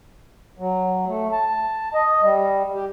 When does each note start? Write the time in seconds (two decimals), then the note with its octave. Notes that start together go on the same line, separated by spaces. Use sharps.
0.58 F#3
1.07 A3
1.32 A5
1.94 D#5
2.22 G3
2.74 G4